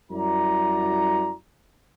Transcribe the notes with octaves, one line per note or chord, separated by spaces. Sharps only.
F#2 G3 E4 F#4 D5 A#5